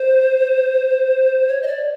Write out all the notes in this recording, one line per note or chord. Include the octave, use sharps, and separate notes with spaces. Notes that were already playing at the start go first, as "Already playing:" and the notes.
Already playing: C5
C#5
D#5
D5